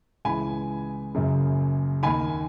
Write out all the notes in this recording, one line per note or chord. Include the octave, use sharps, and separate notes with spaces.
C#2 C#3 E3 G#5 B5
F#1 F#2 C#3
D#2 D#3 G#5 B5